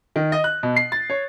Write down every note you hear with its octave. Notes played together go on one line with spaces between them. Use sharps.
D#3
D#5
F#6
B2
C7
A6
C#5